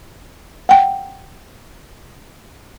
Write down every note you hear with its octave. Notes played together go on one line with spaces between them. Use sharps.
F#5 G5